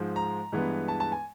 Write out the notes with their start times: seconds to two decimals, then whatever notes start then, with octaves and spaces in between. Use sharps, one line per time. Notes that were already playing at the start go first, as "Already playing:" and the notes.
Already playing: G#2 F3 G#3
0.16 A#5
0.52 G2 E3 G#3 B3
0.88 A5
1.00 A5
1.12 G#5